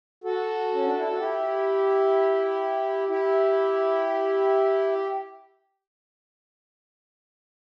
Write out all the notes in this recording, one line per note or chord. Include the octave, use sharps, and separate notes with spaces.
F#4 A4
C#4
D4
E4
F#4
E4 G4
E4 G4